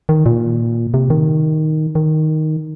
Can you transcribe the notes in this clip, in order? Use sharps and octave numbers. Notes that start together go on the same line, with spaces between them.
D#3
A#2
C3
D#3
D#3